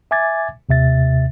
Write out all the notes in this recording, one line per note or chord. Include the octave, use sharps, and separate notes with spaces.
E5 G#5 D6 G#6 A6
D#2 C3 E5 A6